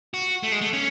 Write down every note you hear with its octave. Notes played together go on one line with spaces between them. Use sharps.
F#4
A3
G#3
A3
C#4